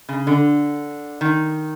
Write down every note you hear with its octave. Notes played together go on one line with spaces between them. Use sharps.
C#3
D3
D#3